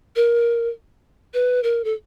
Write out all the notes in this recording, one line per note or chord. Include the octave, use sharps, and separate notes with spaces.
A#4
B4
A#4
A4